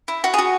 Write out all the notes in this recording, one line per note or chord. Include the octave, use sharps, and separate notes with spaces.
E4
F#4
G#4
F#4